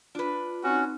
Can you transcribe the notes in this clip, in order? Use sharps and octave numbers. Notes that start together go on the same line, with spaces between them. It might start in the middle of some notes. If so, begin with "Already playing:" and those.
D4 F4 B4
C4 C#4 D#4 F#4